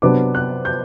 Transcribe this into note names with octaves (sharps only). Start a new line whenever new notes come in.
C3 F#3 B3 D4 D6
F#6
G6